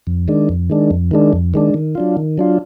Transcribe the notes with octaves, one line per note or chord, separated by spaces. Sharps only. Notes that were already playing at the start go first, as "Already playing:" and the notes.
F2
D#3 G#3 D4
F2
D#3 G#3 D4
F2
D#3 G#3 D4
F2
D#3 G#3 D4
D#3
F#3 D4 F4
D#3
F#3 D4 F4